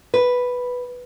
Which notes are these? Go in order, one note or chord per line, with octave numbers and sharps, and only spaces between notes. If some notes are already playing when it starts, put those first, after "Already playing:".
B4